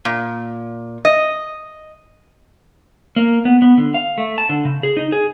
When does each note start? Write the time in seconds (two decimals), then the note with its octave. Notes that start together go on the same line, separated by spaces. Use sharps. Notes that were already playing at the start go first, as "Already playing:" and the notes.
0.05 A#2
1.05 D#5
3.16 A#3
3.45 B3
3.62 B3
3.78 D3
3.94 F5
4.18 A3
4.38 A5
4.49 D3
4.65 C#3
4.83 G#4
4.97 D#4
5.12 G#4